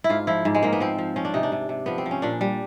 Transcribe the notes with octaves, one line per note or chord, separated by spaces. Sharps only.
E4
G#2 F4
F3 E4
G#2
G#3
G#2 A#3
B3
F3 C4
F3
F3 C#4
D4
C3 D#4
D4
C3
C3
F3 B3
C4
F3
C#4
A#2 D4
G3